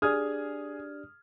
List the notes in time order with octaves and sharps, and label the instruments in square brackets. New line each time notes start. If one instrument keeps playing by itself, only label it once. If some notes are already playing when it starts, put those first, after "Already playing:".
[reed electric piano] D4 G4 D5 [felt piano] G#4 [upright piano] D#6 F6 G#6